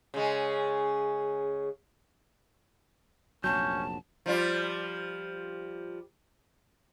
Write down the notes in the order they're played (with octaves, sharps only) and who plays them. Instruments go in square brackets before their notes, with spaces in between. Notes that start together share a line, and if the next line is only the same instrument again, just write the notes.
[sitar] C#3 G#3
[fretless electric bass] F1 A#1 F#3 [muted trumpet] C#4 [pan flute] A5 [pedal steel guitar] G6
[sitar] F3 G3 F4